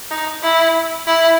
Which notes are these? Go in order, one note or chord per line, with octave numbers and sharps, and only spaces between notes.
D#4
E4
E4